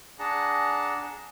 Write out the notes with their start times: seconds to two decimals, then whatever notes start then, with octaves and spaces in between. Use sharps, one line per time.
0.19 D4 G#4 F#5 A5 A#5